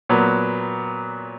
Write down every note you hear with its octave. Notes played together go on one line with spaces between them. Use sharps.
A#2 F#3 B3